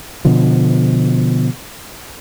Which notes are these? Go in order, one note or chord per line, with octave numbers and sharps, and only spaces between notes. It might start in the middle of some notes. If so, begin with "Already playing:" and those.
B2 D3 F3